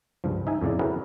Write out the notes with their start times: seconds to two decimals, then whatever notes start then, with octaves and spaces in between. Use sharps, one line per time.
0.24 C#2 G2 F3
0.47 D#4 E5 G#5
0.61 F2 A2 C#3 D5
0.79 C#4 E4 F#4 G#4 A#4 B4